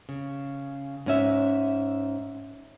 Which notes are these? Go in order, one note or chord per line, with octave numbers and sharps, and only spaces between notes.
C#3
G#2 C#4 E5